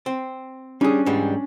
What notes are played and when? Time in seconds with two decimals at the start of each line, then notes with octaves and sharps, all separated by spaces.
0.06 C4
0.81 G3 C#4 D4 G#4
1.06 G#2 E3 G3